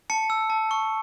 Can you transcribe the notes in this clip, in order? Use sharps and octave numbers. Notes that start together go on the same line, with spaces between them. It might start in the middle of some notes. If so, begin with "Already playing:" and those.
A5 C#7
E6
A5
C#6